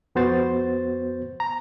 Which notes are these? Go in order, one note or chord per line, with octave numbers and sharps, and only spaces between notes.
F2 B3 F#4 C5 A6
A#5